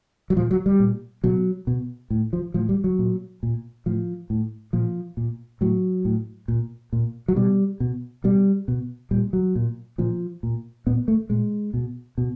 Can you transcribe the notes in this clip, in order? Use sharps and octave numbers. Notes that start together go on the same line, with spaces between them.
F#3
A#2 F3
F#3
G3
A#2
B2 F#3
B2
A2
F3
A2 F3
G3
F#3
A#2
A#2
A2 F3
A2
A#2 F3
A#2
A2 F#3
A2
A#2
A#2
F#3
B2 G3
B2
B2 G3
B2
A#2 G3
F#3
A#2
A#2 F3
A#2
A#2 B3
A3
A#2 G#3
B2
B2